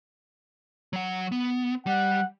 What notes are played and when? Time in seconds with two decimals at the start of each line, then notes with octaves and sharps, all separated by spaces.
0.93 F#3 F#5
1.32 B3
1.87 G3 F#5